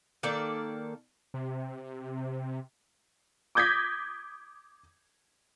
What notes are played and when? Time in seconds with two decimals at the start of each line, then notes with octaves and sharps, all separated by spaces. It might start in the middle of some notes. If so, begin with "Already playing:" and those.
0.23 D#3 A#3 A4 D5
1.34 C3
3.55 D6 D#6 G6 G#6 A#6 B6